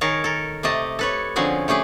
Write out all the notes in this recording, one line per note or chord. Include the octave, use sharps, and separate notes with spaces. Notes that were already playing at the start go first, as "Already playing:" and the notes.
D#3 G#4 A#4 C#5 A5
A4 A#4
C3 A3 G4 D#5 A5
A4 B4 C#5
D3 F3 C4 C#4 F#4 G#4
A3 C#4 G4 G#4 B4